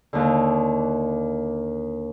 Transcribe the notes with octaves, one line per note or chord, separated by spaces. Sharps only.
D#2 D3